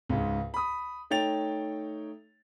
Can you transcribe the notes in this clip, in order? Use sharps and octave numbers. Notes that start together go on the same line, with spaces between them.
C#2 G#2
B5 D#6
A3 D#4 C#5 G5 A6 F7